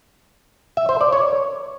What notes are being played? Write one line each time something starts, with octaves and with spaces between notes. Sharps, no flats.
E5
C5
D5
C#5